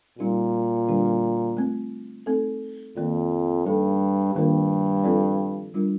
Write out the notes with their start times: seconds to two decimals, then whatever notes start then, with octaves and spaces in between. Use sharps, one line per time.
0.19 A#2 G3 C4 D#4 G4
0.88 D3 G3 D4 G4
1.57 A3 C4 F4
2.26 A3 C4 D#4 A4
2.96 F2 D#3 A#3 F4 A#4 D5
3.66 G2 F3 A#3 D#4 A4 C5
4.35 G2 D#3 A#3 D4 F4 A#4
5.04 F3 C4 F4 A4 D5
5.74 G3 D4 F4 A#4